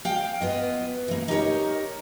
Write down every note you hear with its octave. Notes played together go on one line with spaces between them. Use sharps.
F5 G5
B3 F4 D#5
E3 A#3
D#4 G4 A#4 C#5